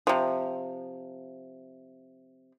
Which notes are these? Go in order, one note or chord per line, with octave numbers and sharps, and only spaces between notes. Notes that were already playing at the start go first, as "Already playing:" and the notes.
C3 F3